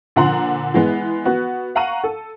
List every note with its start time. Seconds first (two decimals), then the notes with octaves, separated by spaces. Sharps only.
0.16 A#2 D3 F3 F#5 A#5 C6
0.74 E3 G#3 B3
1.25 B3 F#4
1.75 F5 F#5 A#5 C#6 D#7
2.04 A4